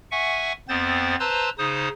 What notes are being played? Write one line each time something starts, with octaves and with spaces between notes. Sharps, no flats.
E5 F#5 G#5 C#6
F2 B3 C4 C5 A6
B4 C5 A5 A#5 C6 E6
C#3 D#4 C5 D#6